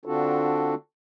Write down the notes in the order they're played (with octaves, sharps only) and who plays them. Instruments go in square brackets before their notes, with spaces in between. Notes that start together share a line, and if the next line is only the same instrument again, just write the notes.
[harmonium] D3 C4 D4 F4 F#4 A4